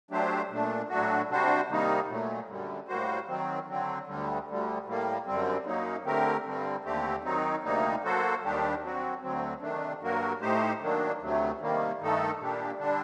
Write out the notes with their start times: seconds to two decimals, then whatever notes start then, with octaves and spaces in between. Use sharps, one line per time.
0.11 F#3 A3 D4 G4 C5
0.50 A#2 A3 D4
0.89 A2 F#3 A3 D4 F#4
1.29 C3 G3 D4 F#4 C5
1.69 C3 D#3 G3 A#3 D#4
2.08 A#2 F#3 A3
2.48 F#2 D3 G3
2.88 A2 G3 A#3 F#4 C5
3.28 D#3 F#3 C4
3.67 D3 F#3 C4
4.07 D2 D3 G3
4.47 D2 D3 G3
4.85 A2 G3 A#3
5.26 F#2 D3 G3 C4
5.65 F#2 F#3 A#3 D#4
6.05 D3 A3 C4 G4 A#4
6.45 G2 D3 G3 C4
6.84 D#2 D3 A3 C4 G4
7.24 D#3 F#3 C4 D#4
7.64 D2 C3 G3 A#3 D#4
8.04 F#3 A#3 F#4 A4 C5
8.43 D#2 D#3 G3 D4 G4
8.82 F#3 C4 F#4
9.22 D2 D3 F#3 C4
9.61 C3 D#3 A3 D4
10.01 G2 F#3 A#3 F#4 A#4
10.41 A2 A3 D#4 G4 C5
10.80 D#3 F#3 A#3 D4
11.20 D2 C3 F#3 A3
11.60 C3 D#3 G3 A#3
12.00 G2 D#3 A3 D#4 A4
12.39 A#2 G3 A#3 D4 G4
12.79 D3 G3 D4